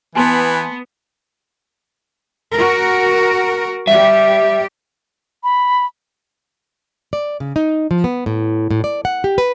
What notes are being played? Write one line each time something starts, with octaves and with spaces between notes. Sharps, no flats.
E3 B3 G#5 A5 C6
F#4 A#4
G3 G4 E5
B5
D5
C#3
D#4
F3
B3
A2
A2
D5
F#5
G4
B4